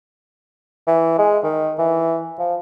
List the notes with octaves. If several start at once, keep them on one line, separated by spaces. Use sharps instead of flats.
E3
G#3
D#3
E3
F3